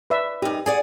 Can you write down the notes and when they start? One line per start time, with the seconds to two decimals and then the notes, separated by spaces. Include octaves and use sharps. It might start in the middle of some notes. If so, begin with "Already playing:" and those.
0.10 B4 D5 E5
0.42 F#2 D#4 G4
0.66 G#4 D5 F#5 G#5